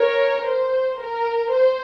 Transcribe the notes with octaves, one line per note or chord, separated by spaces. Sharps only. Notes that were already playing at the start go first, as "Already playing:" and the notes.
Already playing: A#4 C#5
C5
A#4
C5